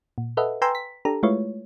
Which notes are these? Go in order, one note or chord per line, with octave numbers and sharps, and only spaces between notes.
A#2
A4 B4 D#5 E5 F#5
B4 G5 G#5 A#5 C6 E6
B6
D4 G4 A4 A#5
G#3 A3 E4 F4 B4 C#5